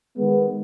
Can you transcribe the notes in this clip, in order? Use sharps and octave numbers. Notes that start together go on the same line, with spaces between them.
D#3 G#3 B3